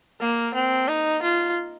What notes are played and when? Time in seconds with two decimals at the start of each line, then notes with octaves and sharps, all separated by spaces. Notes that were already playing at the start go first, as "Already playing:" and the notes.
0.21 A#3
0.54 C4
0.88 D#4
1.22 F4